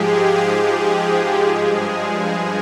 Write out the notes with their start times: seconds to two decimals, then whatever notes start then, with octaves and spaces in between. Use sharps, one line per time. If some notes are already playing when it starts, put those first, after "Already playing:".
Already playing: G#2 F3 G#3 G4 G#4
0.15 G#4
0.47 G#4
0.80 G#4
1.12 G#4
1.45 G2 F3 G#3